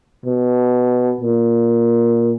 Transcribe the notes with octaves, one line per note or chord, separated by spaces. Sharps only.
B2
A#2